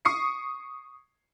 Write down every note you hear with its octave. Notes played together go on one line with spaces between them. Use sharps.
C#6 D#6 C7 C#7